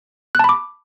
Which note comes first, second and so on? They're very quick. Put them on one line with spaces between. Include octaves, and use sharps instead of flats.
F#6 A5 B5 D6